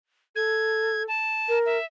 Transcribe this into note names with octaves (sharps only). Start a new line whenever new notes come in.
A4 G#6
A5
A#4
E5